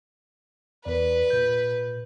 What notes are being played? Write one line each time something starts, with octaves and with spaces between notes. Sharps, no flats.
E2 B4 D5
A#2 G6